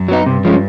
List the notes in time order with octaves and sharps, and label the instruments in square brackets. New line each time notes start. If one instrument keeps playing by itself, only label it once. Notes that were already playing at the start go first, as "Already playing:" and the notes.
Already playing: [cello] F#2
[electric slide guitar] F#3 B3 D#4
[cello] G2 [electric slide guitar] C3
[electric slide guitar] F3 G#3 C#4